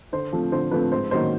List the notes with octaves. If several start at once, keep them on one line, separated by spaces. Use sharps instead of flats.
D3 C5
F3 A3 C4
D3 C5
F3 A3 C4 B4
G#2 C5
D#3 F#3 A#3 C#4 C5